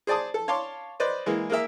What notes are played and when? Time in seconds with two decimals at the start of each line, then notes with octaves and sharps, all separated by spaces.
0.07 G#4 C5 D5 G#5 A5 D#6
0.34 A4
0.48 C#5 F5 A5 C6 D6
1.00 B4 C5 D5 D#5
1.26 E3 G#3 A#3
1.50 A#3 G#4 A#4 E5